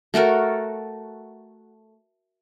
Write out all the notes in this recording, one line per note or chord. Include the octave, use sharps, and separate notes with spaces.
A3 F#4 A4 A#4